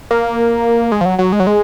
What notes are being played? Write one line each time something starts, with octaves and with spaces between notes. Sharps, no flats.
A#3
G#3
F3
F#3
F#3
G#3
F#3
G#3